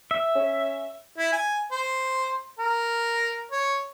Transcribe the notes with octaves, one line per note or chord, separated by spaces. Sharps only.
E5
C#4
E4
G#5
C5
A#4
C#5